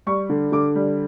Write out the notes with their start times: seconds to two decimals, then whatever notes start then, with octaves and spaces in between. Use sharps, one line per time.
0.07 G3 C#6
0.30 D3
0.52 D3 D6
0.75 G3